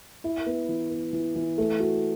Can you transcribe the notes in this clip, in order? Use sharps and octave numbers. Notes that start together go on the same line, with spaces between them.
E4
B3
E3
B3
E3
E3
A3
F#4